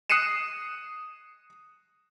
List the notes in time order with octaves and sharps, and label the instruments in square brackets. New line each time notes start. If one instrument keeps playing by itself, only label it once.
[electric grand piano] D#6 F#6 C7 C#7 D#7 E7